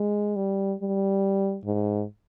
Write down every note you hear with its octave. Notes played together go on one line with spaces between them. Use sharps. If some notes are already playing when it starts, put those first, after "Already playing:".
Already playing: G#3
G3
G3
G#2